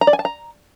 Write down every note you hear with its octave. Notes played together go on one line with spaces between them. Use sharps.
A#5
D5
G#5
A5
A#5